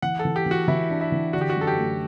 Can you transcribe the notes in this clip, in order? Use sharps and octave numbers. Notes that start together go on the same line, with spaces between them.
E3 F#5
A4
E3
G4
E3 F#4
E3 E4
D4
E4
E3
D3 F#4
G4
F#4
F#2 A4
G4
A3